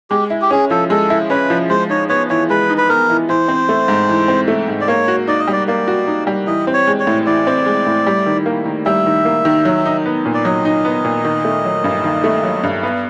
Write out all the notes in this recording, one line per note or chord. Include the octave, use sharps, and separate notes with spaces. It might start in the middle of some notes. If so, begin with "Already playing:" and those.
G#3 G4
E4
G4
C#4 G#4
F3 A4
G#3 A4
E4
C#4 B4
F3
G#3 C5
D#4 C#5
B3 C#5
E3 C#5
G#3 B4
D#4
B4
B3 A#4
E3
E3 C5
C4
A3
G#2
E3
C4
A3
G#2
D5
A#3 C#5
F#4
D#4 D5
D#5
G3
D5
A#3 D5
F#4
D#4
G3
E3 D#5
C4
C#5
G#3
C#5
A2
E3 D5
C4
G#3
A2
G3
D#3
A#3
D#3
G3 E5
D#3
A#3
D#3
F#3
D#4
B3
A#2
D5
F#3 D#5
D#4
B3
A#2
D#3
A3
F#3
G2
D#3
A3
F#3
G2
B3